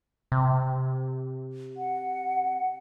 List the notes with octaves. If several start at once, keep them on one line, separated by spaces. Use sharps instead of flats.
C3
F#5